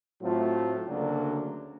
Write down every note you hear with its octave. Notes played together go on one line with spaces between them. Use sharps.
A2 F#3 A3 C4 F4
D2 C#3 F#3 A#3 D4